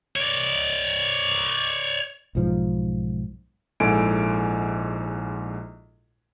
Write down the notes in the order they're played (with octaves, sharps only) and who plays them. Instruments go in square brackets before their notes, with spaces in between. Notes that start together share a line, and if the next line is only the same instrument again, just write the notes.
[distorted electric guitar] C#5 D5
[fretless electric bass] B1 G#2 F3
[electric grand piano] A#1 G#2 E4 A4 G#5 D7